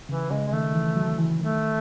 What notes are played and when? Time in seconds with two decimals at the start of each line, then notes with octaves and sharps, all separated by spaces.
0.08 C#3 E3
0.30 C#3 G#3
0.47 G#3
0.52 D#3 A3
0.74 E3
0.96 F#3
1.18 E3
1.40 D#3 A3